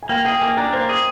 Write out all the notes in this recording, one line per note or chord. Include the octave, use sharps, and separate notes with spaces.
G#5
A#3 G5
G#4 G5
A#3 G#5
D4 A#5
A#3 C5
G#4